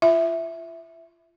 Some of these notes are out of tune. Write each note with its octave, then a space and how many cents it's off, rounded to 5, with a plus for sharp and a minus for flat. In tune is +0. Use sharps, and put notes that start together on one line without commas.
F4 -25 E5 +0 B5 +30